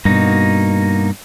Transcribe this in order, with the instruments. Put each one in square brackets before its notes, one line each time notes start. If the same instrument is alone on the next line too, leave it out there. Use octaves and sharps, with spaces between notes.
[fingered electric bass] G2 B2 [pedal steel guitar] A#3 D#4 F#4